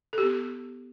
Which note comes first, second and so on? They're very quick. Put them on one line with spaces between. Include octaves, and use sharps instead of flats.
A4 G4 B3